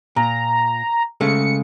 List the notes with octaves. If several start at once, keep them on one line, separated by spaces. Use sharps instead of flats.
A#2 A#5
C#3 G#3 A3 C#7